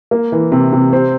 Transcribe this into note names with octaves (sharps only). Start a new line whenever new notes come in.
A#3
E3
C3
C3
C4